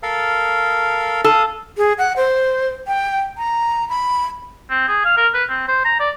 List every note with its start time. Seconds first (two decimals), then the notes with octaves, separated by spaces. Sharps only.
0.03 A4 A#4 F5
1.24 A4 F5 D#6
1.78 G#4
1.98 F#5
2.17 C5
2.87 G5
3.38 A#5
3.89 B5
4.70 C4
4.88 G#4
5.05 F5
5.17 A#4
5.34 B4
5.49 C4
5.68 C5
5.85 A#5
6.00 D5